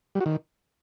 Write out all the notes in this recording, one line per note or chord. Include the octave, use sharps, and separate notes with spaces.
G3
F#4
D#3